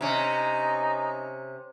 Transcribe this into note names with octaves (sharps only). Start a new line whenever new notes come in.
C3 C#4 D#4